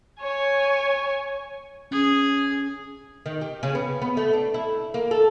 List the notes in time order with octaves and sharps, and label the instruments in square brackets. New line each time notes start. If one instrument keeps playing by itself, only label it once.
[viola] C#5 G#5
[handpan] C#4 [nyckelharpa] G#4
[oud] D#3
G4
C#3
B3
B3
A3
D4
E4
A#3
A4